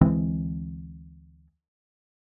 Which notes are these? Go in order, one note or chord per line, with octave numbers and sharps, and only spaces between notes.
D2 E3 G#3 C4